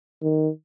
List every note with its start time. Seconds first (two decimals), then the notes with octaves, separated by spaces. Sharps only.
0.22 D#3